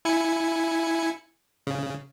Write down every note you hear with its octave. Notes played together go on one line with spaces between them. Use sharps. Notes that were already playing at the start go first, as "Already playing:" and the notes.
E4 G#5 C#7
C#3